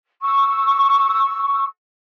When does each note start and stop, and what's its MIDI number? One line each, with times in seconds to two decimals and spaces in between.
0.22 1.64 85
0.22 1.64 88